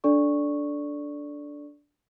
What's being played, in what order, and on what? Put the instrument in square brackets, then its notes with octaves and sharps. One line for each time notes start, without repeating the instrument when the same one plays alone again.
[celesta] D4 A4 D5 C#6